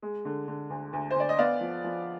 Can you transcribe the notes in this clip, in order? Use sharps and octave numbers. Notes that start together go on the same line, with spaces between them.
G#3
D3
D3
D2
D2
C5
D2 D5
D#5
B3 D5 F5
F3
F3